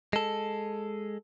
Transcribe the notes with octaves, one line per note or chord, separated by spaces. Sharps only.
G#3 A4